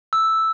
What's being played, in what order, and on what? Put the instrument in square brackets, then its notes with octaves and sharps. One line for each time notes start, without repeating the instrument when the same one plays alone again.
[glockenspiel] E6